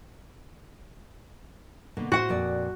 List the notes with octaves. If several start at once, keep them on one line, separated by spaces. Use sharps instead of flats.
B2 D3 A#3
A2 F#4 C5 F#5
F2 A#2 D5